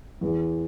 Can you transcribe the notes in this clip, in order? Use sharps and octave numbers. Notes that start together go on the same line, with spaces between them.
E2